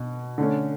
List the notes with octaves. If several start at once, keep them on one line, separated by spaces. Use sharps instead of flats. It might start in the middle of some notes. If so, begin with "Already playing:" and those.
Already playing: B2
D3 A3 C#4